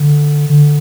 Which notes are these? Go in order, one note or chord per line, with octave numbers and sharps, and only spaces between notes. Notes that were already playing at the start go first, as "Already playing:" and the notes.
Already playing: D3
D3